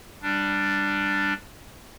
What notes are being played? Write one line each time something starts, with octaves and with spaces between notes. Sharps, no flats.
G3 D4